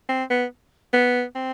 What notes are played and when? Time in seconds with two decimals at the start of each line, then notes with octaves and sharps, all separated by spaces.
0.09 C4
0.30 B3
0.93 B3
1.35 C4